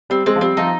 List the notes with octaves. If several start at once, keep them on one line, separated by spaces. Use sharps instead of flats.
G3 C4
G#3 C4
F3
G3 C4
F3 D#4